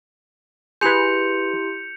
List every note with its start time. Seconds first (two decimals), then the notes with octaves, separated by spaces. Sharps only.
0.81 E4 G4 G#4 B4 C6 G6 C#7 F7